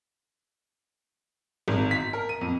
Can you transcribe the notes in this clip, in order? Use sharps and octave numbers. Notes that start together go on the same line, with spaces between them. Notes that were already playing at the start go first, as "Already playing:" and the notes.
G#1
B6
A#4
D#7
F2